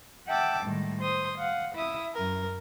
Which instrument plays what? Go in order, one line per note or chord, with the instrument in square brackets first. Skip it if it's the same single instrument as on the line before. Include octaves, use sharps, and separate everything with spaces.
[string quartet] E5 F#5 G5 A5 D6 E6
A2 D#3 G3 G#3
C5 C6 D#6
F5 F#5
E4 E5 D#6
F#2 A#4